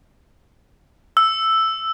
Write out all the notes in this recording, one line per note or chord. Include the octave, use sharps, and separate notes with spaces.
E6